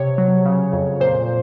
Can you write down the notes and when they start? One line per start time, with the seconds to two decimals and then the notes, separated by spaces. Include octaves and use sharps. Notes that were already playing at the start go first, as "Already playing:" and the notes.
Already playing: C3 C#5
0.18 F#3
0.46 C#3
0.73 F2
1.00 A#2 C5